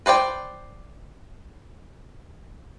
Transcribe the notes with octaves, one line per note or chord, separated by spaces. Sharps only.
B4 C5 D5 G5